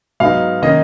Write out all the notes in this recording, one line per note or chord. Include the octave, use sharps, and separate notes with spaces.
G#2 F#3 B3 D#4 F5
D#3 A#3 C#4 D#5